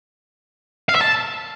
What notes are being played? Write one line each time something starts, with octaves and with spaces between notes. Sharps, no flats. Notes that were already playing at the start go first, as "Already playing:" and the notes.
F5
E5
A5